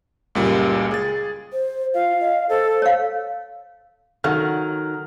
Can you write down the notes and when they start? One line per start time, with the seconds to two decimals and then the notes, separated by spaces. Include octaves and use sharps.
0.35 C#2 F#2 A#2 G3
0.91 G#4 A6
1.53 C5
1.94 F4 F5
2.20 D#5
2.49 A4 C5
2.82 C#5 F5
4.24 D#3 F#3 A4 F#5 F6